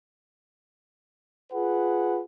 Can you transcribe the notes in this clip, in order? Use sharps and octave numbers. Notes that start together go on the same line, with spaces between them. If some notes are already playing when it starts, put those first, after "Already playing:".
F4 G#4 B4 F#5